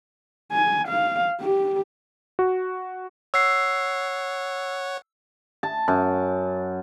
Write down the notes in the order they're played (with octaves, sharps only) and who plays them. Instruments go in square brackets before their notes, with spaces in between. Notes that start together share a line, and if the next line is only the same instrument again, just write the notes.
[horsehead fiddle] G#5
F5
G4
[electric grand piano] F#4
[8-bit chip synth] C#5 F#5 [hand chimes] E6 C7
[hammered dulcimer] A5
F#2